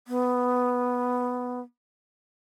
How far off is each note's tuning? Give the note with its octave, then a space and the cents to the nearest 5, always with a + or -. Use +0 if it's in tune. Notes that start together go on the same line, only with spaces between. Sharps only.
B3 +5